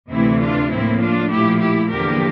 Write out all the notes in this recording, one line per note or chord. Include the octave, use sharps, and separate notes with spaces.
D2 C3 E3 A3 C4 E4
D4 F4
A2 F3 A#3 C4 E4
D4 F4
A#2 F3 A3 E4 G4
E4 G4
E2 D3 F3 A#3 G4 A#4